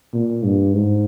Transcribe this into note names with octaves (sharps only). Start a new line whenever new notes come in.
A#2
G2
G#2